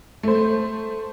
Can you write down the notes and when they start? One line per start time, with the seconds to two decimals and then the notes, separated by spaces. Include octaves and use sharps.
0.23 A3 C5